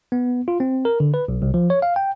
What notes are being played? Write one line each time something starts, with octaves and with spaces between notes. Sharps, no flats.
B3
F4
C4
A#4
D3
B4
B1
C2
F3
C#5
F5
G5